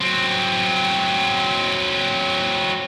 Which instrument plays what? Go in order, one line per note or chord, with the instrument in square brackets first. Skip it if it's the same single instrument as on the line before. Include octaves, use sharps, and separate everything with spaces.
[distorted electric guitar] F#3 C4